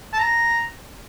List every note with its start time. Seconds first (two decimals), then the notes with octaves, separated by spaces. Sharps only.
0.13 A5
0.20 A#5